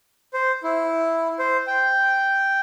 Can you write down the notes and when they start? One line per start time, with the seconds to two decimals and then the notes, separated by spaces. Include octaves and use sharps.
0.34 C5
0.63 E4
1.39 C5
1.67 G5